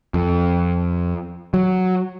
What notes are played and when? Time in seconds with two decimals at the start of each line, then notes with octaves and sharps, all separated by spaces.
0.14 F2
1.54 F#3